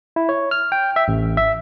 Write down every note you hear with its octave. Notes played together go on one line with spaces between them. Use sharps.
E4
C#5
F6
G5
E5
A1
E5